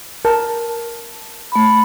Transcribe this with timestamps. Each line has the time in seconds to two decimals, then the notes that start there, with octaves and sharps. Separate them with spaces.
0.25 A#4 A5
1.52 A3 B5